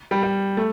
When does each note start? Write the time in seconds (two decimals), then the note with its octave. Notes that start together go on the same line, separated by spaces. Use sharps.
0.11 G3
0.23 G3
0.57 A3